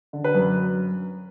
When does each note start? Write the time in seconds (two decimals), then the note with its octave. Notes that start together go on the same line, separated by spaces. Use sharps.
0.13 D3
0.24 B4
0.35 F#2